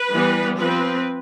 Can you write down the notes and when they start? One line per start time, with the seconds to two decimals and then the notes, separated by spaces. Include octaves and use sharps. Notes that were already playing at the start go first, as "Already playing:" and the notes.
Already playing: B4
0.13 E3 G3 B3
0.58 F3 C4 B4